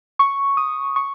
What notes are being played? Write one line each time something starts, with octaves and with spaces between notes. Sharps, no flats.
C#6
D#6
C#6